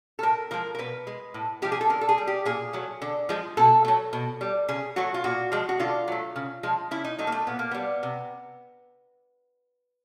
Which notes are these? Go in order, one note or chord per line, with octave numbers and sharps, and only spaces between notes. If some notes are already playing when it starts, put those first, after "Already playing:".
A4
A2 A#4
F3 G#3 A#4
A#4
B2 B4
G#3
A2
F3 G#3 G4
G#4
A4
D3 A#4
A4
G#4
G3
G4
A#2 G#4
F#3 A3
D3
F3 G#3
B2 A4
F#3 A3
B2
G3
C#3 G#4
F#3 A3 F#4
F4
A#2 F#4
F3 G#3
F#4
D3 F4
F#3 A3
C#3
F3 G#3
C#3 E4
D#4
F#3 A3 D#4
A#3
A3
A#2 B3
A#3
G3 B3
C3